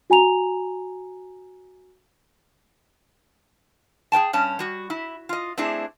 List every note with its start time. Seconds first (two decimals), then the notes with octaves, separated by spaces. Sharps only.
0.10 F#4 G#5 A#5 F7
4.12 G#4 C5 G5 A5
4.33 G2 C#4 A5
4.59 G3 F#4
4.90 E4
5.29 F4 D#5
5.58 A3 C4 D4 E4 G#4